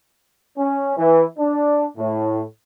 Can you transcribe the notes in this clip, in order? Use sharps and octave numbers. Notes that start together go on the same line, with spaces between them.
C#4
E3
D4
A2